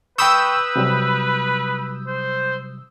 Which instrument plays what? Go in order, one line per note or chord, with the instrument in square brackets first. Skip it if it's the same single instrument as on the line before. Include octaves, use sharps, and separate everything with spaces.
[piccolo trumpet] B4 [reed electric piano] G5 B5 C#6 [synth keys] D#6 E6 G6
[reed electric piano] C3 F#3 G3
[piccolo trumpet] C5